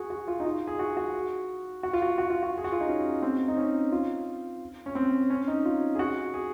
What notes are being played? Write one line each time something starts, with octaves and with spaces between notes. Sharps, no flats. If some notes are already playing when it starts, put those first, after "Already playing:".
Already playing: F#4 G#4
F#4
F4
D#4
F4
G#4
F#4
F#4
F#4
F4
F#4
F#4
F4
F#4
G#4
F#4
F4
D#4
C#4
C4
D#4
C#4
F4
C#4
C4
C#4
D#4
F4
G#4
F#4
G#4